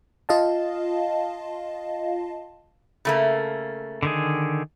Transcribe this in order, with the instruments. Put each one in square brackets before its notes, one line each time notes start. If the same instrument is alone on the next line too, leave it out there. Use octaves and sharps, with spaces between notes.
[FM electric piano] F4 D#5 F5 A5
[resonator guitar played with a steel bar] C#3 A3 A#3
[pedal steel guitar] D3 D#3 G#4